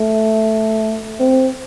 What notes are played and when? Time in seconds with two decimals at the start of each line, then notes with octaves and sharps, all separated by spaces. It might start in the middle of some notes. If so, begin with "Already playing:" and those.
Already playing: A3
1.20 C4